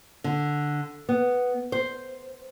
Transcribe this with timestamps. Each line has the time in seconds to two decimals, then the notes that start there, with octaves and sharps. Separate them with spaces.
0.24 D3
1.09 B3
1.72 C5